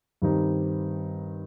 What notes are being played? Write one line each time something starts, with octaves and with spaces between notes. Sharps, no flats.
G2 D#3 G3 C4 D#4